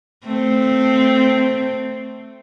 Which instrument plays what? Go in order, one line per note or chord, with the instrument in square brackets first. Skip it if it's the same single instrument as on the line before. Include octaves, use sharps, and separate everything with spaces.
[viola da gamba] A3 C4